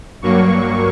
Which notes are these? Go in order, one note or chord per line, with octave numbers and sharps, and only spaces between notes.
G2 F#3 A#3 C#6